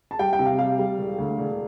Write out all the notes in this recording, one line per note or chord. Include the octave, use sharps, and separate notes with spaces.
A5
G3 G5
G5
C3
F5
G3 F5
G3
E1
D2
E1